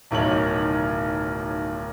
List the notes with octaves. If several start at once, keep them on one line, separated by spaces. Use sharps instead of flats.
D1 B1 D#3 C#5 F6 F#7